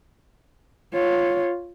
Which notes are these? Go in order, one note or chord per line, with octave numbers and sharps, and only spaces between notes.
F4 C#5